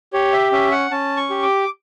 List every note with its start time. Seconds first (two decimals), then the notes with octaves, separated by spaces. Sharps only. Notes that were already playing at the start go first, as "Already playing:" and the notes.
0.13 G4 C#5
0.33 E5
0.52 C#4 E5
0.71 F#5
0.91 C#4 A5
1.17 C#6
1.30 G4
1.43 D6